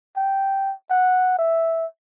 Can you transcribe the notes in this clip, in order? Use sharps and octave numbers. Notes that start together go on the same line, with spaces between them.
G5
F#5
E5